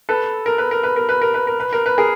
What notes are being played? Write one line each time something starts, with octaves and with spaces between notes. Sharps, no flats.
A4 B4
A#4
B4
A#4
B4
A#4
B4
A#4
B4
A#4
B4
A#4
B4
G#4 A#4